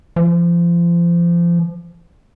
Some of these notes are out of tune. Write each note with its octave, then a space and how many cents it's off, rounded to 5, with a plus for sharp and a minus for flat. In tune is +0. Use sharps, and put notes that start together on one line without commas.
F3 -30